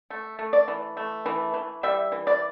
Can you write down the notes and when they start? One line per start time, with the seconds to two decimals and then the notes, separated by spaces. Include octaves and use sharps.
0.10 A3
0.39 A3
0.53 D5
0.68 E3
0.97 A3
1.26 E3
1.54 E3
1.83 G3 E5
2.12 E3
2.27 D5